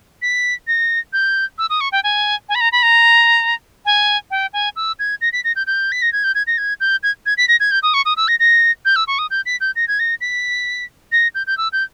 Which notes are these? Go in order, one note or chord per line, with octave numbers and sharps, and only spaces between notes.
B6
A#6
G6
E6
D#6
C#6
G5
G#5
G#5
B5
A#5
B5
A#5
G#5
G5
G#5
E6
G#6
A#6
B6
A#6
G6
G6
B6
A#6
G#6
G6
G#6
A#6
G#6
G6
G#6
G#6
B6
A#6
G#6
G6
D#6
C#6
D#6
E6
A#6
A#6
G6
E6
C#6
D#6
G6
B6
G6
A#6
G#6
A#6
B6
A#6
G6
G6
E6
G6